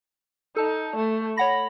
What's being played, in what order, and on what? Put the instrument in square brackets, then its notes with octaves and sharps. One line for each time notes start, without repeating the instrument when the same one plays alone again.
[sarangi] D#4 [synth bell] A4 A5
[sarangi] A3
[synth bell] C#5 F#5 A#6 [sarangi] B5